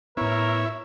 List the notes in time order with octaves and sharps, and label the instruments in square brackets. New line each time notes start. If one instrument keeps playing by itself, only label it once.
[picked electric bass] A2 B3 [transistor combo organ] E4 [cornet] A#4 [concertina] C#5